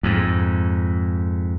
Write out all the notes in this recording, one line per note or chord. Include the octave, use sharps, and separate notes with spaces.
F2 G#2